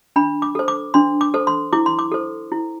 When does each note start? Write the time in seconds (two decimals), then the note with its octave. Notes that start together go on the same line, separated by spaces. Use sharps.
0.16 D4 B5
0.42 D6
0.55 A4 C5
0.68 D6
0.94 D4 C6
1.21 D6
1.34 A4 C5
1.47 C6
1.73 E4 D6
1.86 C6
1.99 D6
2.12 A4 C5
2.52 E4